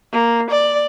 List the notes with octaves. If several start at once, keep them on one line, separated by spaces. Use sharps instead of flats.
A#3
D5